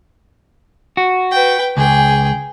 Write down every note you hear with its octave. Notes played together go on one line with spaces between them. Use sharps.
F#4
B4 G5
C#2 G#4 G5